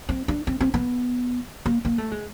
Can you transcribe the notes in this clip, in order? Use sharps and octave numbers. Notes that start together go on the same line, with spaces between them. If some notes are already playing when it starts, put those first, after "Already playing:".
C4
D4
C4
C4
B3
A#3
A#3
A3
G#3